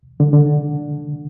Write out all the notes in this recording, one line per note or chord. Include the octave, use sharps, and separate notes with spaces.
D3
D3